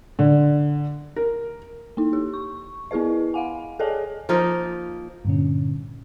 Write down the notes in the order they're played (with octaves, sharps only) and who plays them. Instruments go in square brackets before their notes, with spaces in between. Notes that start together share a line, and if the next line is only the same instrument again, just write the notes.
[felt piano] D3
A#4
[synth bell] A#3 D#4
G4
C#6
B3 E4 G#4 B4 D#5
F5 F#5 G#5
G#4 A4 C#5 D#5 G#5 A5
[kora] F3 A#3 D#4 A#4
[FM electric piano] G2 A#2 D3 C#4